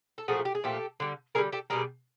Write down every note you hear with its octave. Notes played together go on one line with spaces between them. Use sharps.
A4
A#2 F3 A3 F#4 G#4
G4
G#4
A#2 F3 A3 G4 A4
D3 G3
D3 G3 G#4 A#4
G4 A4
B2 G3 G#4 A#4